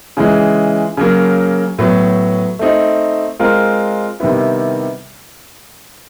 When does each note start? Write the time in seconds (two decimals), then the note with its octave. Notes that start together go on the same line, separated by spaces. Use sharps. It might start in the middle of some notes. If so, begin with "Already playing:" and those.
0.17 C#3 E3 G#3
0.97 C#3 F#3 A#3
1.79 A2 F#3 B3
2.59 A3 C4 D#4
3.39 G#3 C4 F4 A#4
4.20 C3 D#3 G3 B3 E4